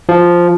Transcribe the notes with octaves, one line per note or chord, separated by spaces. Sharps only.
F3